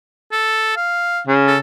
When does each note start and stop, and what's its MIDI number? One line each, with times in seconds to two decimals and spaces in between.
0.32 0.71 69
0.76 1.21 77
1.27 1.58 49
1.47 1.59 69